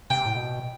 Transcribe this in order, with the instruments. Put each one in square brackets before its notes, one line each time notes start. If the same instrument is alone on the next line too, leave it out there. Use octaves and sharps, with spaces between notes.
[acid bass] C3 [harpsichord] G5
[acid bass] A2
B2